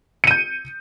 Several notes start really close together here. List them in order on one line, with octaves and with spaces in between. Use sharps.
C#7 D#7 G6